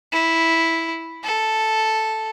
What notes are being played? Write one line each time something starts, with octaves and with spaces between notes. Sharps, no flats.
E4
A4